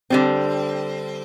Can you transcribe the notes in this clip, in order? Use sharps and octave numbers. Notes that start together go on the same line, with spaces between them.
D3 G3 C4